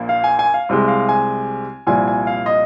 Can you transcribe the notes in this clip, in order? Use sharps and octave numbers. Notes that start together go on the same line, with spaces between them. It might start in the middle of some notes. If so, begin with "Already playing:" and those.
Already playing: A#1 A#2 A#3
F5
G#5
G#5
F5
C2 C3 G#3
F5
G#5
C2 A#2 F3 G#5
G#5
F5
D#5